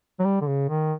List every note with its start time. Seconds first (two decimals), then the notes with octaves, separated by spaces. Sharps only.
0.20 F#3
0.25 G3
0.42 D3
0.47 C#3
0.69 D#3